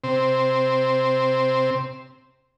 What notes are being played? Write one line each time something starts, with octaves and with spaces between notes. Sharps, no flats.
C3 C4